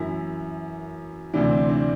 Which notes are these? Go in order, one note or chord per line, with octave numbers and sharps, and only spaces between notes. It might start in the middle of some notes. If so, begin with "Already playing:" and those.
Already playing: F#2 E3 E4
D2 C3 E3 D4
C4
D4